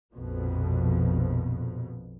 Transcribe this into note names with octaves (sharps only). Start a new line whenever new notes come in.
A#1 F2 B2